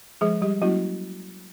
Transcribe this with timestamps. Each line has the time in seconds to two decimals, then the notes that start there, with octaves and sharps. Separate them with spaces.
0.21 F3 G#3 G#4
0.42 G3 G4
0.62 F#3 A#3 C#4 E4 F#4